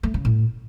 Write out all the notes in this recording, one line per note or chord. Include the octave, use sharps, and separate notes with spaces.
A3
C#3
A2